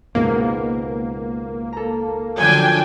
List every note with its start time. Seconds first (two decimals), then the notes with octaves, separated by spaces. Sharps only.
0.15 C#2 G#2 B2 A#3
1.73 A4 A#5
2.38 F#2 D3 F3 D4 G5 G#5